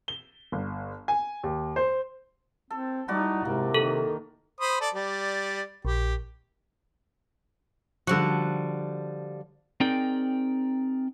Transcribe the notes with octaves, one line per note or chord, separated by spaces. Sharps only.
G7
G1
G#5
D#2
C5
C4 A4
G3 D#4 E4 F#4 D5
G#2 C3 A#3
D#3 A4
C5 B5 D#6
A4 D5
G3 D5
A#1 G4
D3 F3 G3 F#4
C4 D#4 G#4 A#4 D5 G5